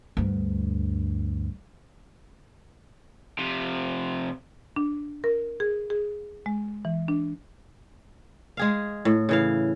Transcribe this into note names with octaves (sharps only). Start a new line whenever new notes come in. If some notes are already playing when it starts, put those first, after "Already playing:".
D2 G2
C3 F3
D4
A#4
G#4
G#4
G#3
E3
D4
G#3 G#4 F5
A2
C#3 E3 F5